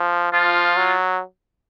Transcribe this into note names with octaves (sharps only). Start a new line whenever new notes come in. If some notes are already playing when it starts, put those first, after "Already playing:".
Already playing: F3
F3 F4
F#3